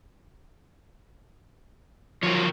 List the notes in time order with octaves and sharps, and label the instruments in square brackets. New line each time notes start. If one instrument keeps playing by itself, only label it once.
[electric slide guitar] F3 F#3 [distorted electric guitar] A#3 C#5